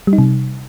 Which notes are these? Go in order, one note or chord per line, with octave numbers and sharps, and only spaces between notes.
G3
D#4
C3